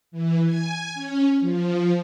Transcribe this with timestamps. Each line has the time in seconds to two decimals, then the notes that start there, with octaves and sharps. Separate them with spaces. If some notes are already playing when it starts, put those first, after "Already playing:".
0.12 E3
0.45 G#5
0.94 C#4
1.40 F3